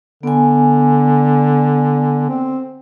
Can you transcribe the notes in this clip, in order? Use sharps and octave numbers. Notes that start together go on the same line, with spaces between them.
D3 B3 G#5
C4